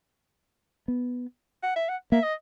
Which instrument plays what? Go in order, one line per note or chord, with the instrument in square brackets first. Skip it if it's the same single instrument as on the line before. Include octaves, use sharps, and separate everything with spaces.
[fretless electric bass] B3
[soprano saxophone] F#5
E5
F#5
[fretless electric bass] A#3 [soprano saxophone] E5
[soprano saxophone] D#5